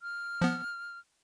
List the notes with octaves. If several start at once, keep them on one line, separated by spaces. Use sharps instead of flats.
F6
F3 B3